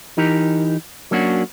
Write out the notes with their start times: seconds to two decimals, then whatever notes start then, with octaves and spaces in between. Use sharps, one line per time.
0.17 E3 D#4 G4 A#4
1.11 F#3 A#3 C#4 D4 F#4